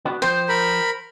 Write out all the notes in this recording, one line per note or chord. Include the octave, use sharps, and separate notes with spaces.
B3 D4 F#4
F3 C5 G5
A#4 B5